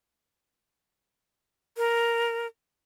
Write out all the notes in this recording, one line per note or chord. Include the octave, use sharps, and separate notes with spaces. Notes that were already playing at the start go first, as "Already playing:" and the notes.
A#4